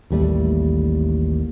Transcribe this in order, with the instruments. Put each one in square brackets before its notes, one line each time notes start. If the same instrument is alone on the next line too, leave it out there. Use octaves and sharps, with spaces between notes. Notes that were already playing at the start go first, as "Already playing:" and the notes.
[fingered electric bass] A1 D#2 G3 A3